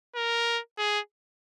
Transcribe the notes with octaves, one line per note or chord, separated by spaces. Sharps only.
A#4
G#4